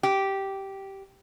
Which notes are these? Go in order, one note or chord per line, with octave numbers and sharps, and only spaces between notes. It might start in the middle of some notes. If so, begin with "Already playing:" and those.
G4